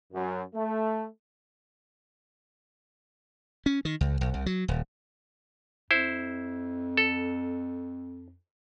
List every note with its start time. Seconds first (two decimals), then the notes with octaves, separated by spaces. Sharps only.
0.13 F#2
0.55 A3
3.66 C#4
3.85 D#3
4.01 C#2
4.21 B1
4.34 C2
4.46 F#3
4.68 D#1
5.91 F2 E4 C5
6.97 A4